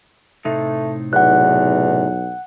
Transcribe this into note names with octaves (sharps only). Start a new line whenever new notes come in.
A2 C3 A3 D#4
B1 E2 F#5 F#6